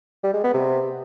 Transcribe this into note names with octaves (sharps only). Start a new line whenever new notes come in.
G3
G#3
B3
C3